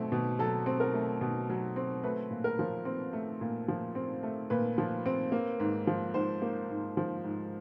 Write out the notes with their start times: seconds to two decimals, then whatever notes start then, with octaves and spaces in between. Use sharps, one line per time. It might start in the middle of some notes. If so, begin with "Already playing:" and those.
Already playing: B2 F#3 A3 C4
0.12 B2
0.39 F#3 A4
0.66 C4
0.80 A#4
0.94 A3
1.21 B2
1.50 F#3
1.76 C4
2.03 A3 B4
2.31 A#2
2.44 A#4
2.59 F3
2.85 C4
3.13 A3
3.41 A#2
3.68 F3
3.95 C4
4.23 A3
4.50 A#2 B4
4.78 F3
5.06 C4
5.32 A#3
5.60 G#2
5.87 F3
6.14 G#2 C5
6.42 A#3
6.70 G#2
6.97 F3
7.24 G#2